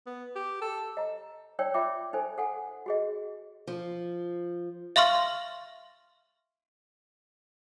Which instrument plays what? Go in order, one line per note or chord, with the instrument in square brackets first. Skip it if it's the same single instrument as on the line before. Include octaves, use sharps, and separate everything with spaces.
[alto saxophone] B3
G4
A4
[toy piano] D#5 A#5
D#4 C#5 D5 G5 E6
F4 E5 G5 D6
D#4 A4 C5 G#5
A4 F#5 G#5
F#4 G#4 D#5
[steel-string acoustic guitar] F3
[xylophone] E5 F5 C6 C#6 F6